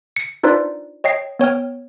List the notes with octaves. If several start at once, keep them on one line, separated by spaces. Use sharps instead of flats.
C#7
D4 D#4 F4 B4 C5 D5
C#5 D#5 G5 C7
B3 C#5 G5 F6